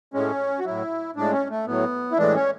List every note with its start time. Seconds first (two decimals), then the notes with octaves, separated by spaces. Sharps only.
0.14 A2 G#3 C#4
0.60 F#4
0.65 A2 F#3 E4
1.16 A2 G#3 D4
1.33 C#4
1.50 A3
1.67 A2 F#3 B3
2.12 E4
2.18 A2 E3 G#3 D4
2.35 C#4